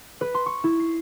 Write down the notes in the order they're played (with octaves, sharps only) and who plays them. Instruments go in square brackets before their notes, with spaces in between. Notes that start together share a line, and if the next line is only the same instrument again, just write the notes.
[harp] B4
C6
C#6
E4
C7